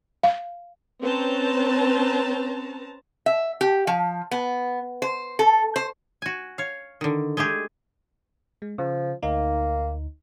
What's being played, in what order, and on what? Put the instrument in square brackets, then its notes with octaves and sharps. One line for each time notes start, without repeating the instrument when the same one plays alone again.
[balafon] F5
[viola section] C4 C#4 B4 C5 A5 A#5
[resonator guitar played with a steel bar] E5
G4
F3
B3
C5
A4
C5
[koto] F#4 G#5
C#5 F5
D3 D#3
G#3 A3 G4 G#4
[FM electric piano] G#3
[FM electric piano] C#3 [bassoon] F3
[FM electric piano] D2 D#4 [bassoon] A#3